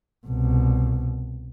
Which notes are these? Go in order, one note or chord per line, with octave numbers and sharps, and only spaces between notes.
C2 B2